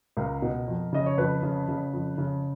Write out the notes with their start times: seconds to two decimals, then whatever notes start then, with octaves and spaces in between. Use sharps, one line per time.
0.17 C#2 A#4
0.42 B2
0.68 F2
0.93 C#3 D#5
1.06 C#5
1.18 F2 B4
1.43 C#3
1.68 C#3
1.93 F2
2.18 C#3